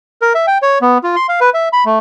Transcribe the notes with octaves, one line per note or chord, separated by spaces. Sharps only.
A#4
E5
G5
C#5
B3
F4
C6
F5
B4
E5
B5
A3